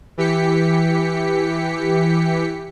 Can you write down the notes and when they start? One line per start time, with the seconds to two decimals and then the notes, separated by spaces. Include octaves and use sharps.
0.17 E3 G4 B6 C#7